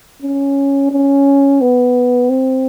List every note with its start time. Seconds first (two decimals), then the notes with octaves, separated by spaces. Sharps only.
0.22 C#4
0.92 C#4
1.61 B3
2.30 C4